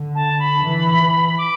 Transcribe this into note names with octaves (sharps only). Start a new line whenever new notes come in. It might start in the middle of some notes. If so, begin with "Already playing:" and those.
Already playing: D3
A5
B5
E3
D6